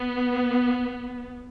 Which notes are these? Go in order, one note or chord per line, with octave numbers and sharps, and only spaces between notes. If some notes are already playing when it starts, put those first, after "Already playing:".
Already playing: B3